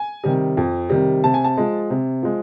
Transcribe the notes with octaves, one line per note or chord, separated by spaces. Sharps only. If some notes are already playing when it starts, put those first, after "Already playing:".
Already playing: G#5
C3 D#3 G3
F2
C3 D#3 G3
C3 A5
G#5
A5
F3 G#3
C3
F3 G#3